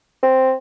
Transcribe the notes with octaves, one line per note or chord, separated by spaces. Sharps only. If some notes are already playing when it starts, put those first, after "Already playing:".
C4